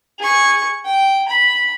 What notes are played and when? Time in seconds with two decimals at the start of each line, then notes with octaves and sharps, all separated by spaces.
0.19 G#4 C#6
0.85 G5
1.28 B5